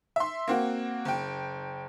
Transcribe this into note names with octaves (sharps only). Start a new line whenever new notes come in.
E5 C6
A#3 C4 F#4
F#1 G5